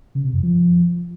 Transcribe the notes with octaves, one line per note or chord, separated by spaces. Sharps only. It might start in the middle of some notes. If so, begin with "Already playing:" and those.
C#3
C3
F#2
F3